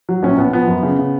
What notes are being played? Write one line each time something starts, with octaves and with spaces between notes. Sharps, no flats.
F#3
A#1 C#4
A#1 B3
F3 B3
F#2
C#3
C#3